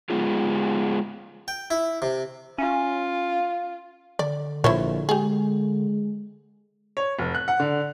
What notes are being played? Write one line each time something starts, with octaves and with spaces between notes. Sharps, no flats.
G#3 B3 F4 G#4
G5
E4
C3
C#4 F4
D3 D5
A#1 A#2 E4 C5 C#5
G#3 G4 G#4
C#5
F1
F#6
F#5
D3